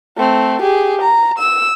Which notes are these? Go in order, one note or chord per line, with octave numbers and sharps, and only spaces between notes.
A3 C4
G4 G#4
A#5
E6